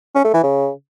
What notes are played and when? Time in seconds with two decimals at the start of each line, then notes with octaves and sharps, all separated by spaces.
0.15 C#4
0.24 A3
0.34 E3
0.43 C#3